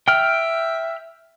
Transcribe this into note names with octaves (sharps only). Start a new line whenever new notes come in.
E5 G5 F6